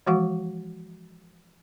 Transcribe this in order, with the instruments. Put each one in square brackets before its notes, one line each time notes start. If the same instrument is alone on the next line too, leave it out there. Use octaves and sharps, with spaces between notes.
[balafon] E3 F3 G#3 F#4 F#5 C#6